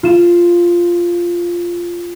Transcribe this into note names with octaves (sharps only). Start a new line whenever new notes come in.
F4 E7